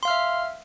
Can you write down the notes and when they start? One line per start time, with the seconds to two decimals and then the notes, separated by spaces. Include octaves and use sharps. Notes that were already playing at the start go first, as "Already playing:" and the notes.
0.03 C6
0.05 F5
0.08 F6
0.10 E5